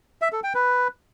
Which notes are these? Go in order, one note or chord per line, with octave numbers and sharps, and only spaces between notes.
E5
A4
G5
B4